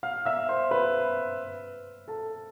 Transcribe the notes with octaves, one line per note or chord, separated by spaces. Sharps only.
F5 F6
E5 E6
C5 C6
B4 B5
A4 A5